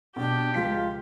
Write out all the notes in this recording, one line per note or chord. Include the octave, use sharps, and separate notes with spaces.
B2 D4 G4
C#2 F3 F4 B6